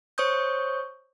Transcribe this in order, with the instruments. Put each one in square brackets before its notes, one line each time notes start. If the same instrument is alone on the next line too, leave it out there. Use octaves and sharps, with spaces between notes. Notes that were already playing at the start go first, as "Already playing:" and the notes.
[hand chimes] C5 C#5 C#6 D#6 G6